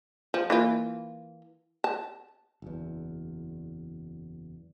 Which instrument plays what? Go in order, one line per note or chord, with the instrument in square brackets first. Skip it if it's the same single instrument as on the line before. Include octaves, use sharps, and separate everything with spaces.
[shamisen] F3
E3 A#3 F4
A5
[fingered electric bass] F#1 E2